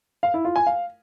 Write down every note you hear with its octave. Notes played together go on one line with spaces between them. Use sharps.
F5
E4
F4
G#5
F5